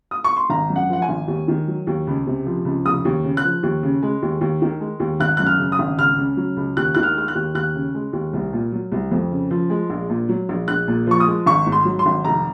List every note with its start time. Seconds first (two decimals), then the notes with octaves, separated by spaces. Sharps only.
0.11 D#6
0.24 C#6
0.37 C6
0.50 G#1 A#5
0.70 F#2
0.76 F#5
0.89 F3 F#5
1.02 G#5
1.09 G#1
1.28 D#2
1.48 D#3
1.68 F#3
1.87 D#2
2.07 C#2
2.27 C3
2.46 F3
2.65 C#2
2.86 F1 D#6
3.05 D#2
3.24 C#3
3.37 F#6
3.44 F3
3.63 D#2
3.83 C#3
4.03 G#3
4.22 D#2
4.41 D#2
4.62 D#3
4.80 G#3
5.00 D#2
5.20 G#1 F#6
5.37 F#2 F#6
5.47 F6
5.59 C#3
5.72 D#6
5.79 G#1
5.99 C#2 F6
6.18 C#3
6.37 F#3
6.57 C#2
6.77 D#2 F#6
6.95 D#3 F#6
7.03 F6
7.15 G#3 F6
7.28 F#6
7.35 D#2
7.55 D#2 F#6
7.75 C#3
7.95 G#3
8.13 D#2
8.33 C2
8.53 A#2
8.72 F#3
8.92 C2
9.11 F2
9.31 C#3
9.51 F3
9.70 G#3
9.90 A#1
10.10 A#2
10.29 F#3
10.49 A#1
10.68 A#1 F#6
10.88 A#2
11.07 F3 C#6
11.20 D#6
11.27 G#3
11.46 G#1 C#6
11.66 G#2
11.72 C6
11.85 F#3
11.99 C6
12.06 G#1
12.24 F1 A#5